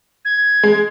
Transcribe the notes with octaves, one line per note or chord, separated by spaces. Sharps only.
G#6
G#3